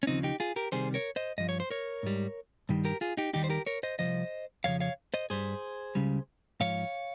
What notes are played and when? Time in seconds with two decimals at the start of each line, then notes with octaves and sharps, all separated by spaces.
0.03 C#4
0.07 D#2 C#3 F3 C4 D#4
0.23 D#4 G4
0.40 F4 G#4
0.56 G4 A#4
0.72 C2 C3 D#3 G3 G#4 C5
0.94 A#4 C#5
1.16 C5 D#5
1.38 G2 F3 D#5
1.49 C#5
1.60 C5
1.70 A#4 C#5
2.03 G#2 G3
2.69 G2 D#3 G3
2.85 G4 A#4
3.01 F4 G#4
3.17 D#4 G4
3.33 D#2 D#3 G3 D#4 G4
3.44 C5
3.50 G4 A#4
3.66 A#4 C#5
3.83 C5 D#5
3.99 C2 A#2 F3 C5 D#5
4.64 F2 C#3 F3 C#5 F5
4.80 C#5 F5
5.14 C5 D#5
5.30 G2 G3 G#4 C5
5.95 C#2 C#3 G3
6.60 G#2 F3 C#5 F5